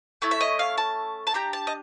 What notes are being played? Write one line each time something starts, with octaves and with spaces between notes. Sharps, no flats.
A3 C#4 E4 A4
E5
D#5
F5
A5
A5
D4 G4 A#5
A5
D#5